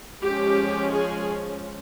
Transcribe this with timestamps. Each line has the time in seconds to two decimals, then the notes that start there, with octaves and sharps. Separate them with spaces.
0.22 F3 G#3 C#4 G4
0.93 G#4